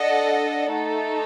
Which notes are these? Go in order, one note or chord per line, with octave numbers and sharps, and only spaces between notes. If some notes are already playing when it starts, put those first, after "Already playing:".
Already playing: D4 A4 D#5 F#5
A3 D#4 A4